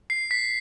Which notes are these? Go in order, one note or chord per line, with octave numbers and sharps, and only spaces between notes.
C7
B6